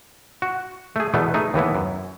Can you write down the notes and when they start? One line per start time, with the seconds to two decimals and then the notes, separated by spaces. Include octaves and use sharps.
0.42 F#4
0.96 A3 G#4
1.14 E2 B2 A3 B3
1.34 A3 D#4 G#4
1.54 D#2 E3 B3 E4
1.75 F#2